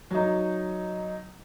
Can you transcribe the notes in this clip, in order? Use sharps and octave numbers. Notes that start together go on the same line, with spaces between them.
F#3 D#4